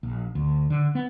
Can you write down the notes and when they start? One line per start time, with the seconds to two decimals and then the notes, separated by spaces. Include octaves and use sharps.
0.03 A#1
0.35 D2
0.70 D3
0.95 B3